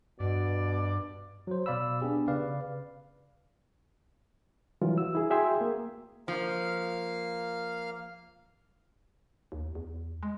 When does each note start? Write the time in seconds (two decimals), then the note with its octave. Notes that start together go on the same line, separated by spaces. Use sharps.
0.20 G2 B2 D5
1.47 F#3 C5
1.66 B2 D5 F5 B5 E6
2.02 B3 D4 G4 G#4
2.28 C#3 B4 D5 F5
4.82 E3 F#3 G3 F4
4.98 F#4 E6
5.15 E4 G#4
5.30 F#4 G#4 E5 G5 G#5 C6
5.61 A#3
6.28 F3 A#3 F5 F6
9.52 D#2
9.75 E2
10.23 G#3